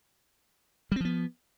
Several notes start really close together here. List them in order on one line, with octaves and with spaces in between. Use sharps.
G3 C4 F3 B3